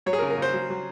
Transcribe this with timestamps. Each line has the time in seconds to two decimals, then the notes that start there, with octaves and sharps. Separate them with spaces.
0.06 F#3 C#5
0.13 G#4
0.19 A#4
0.22 C#3
0.30 A#4
0.38 C#3 C5
0.53 F#3
0.70 F#3